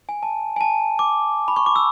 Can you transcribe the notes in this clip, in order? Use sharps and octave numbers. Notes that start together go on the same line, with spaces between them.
G#5
A5
G#5
A5
D6
B5
C#6
D6
E6